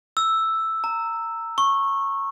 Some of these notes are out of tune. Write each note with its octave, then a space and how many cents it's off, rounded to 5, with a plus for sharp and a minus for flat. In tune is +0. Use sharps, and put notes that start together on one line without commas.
E6 +0
A#5 -20
C#6 -15